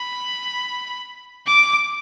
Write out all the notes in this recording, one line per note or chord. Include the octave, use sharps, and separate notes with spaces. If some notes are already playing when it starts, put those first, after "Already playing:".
Already playing: B5
D6